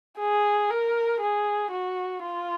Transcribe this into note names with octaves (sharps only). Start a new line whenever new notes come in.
G#4
A#4
G#4
F#4
F4